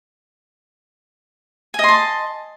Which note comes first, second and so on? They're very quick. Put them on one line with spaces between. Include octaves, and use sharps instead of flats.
G#5 D#5 C6 A5